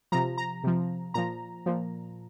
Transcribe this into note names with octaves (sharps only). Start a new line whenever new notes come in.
C3 F3 A#5
A#5
C3 F3
A#2 F3 A#5
A#2 F3